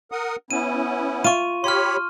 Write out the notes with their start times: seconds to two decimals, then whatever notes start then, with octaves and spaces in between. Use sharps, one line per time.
0.12 A#4 F#5 D#6
0.51 B3 C#4 E4 D#7
1.24 F4 C#6 D#7
1.64 G4 C#5 B5 C6 F6